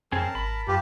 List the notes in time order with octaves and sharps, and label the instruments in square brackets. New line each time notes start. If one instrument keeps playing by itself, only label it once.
[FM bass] F2 [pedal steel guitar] C4 C#4 G#4 [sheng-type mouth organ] A#4 A5
[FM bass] G#1 [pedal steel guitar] B5
[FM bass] F#2 [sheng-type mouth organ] F4 B4 A5 [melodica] G4